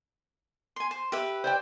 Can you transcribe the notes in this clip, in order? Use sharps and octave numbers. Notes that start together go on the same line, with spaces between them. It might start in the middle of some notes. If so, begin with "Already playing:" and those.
G#5 C6
C5
G4 B4 E5
C5 D5 G5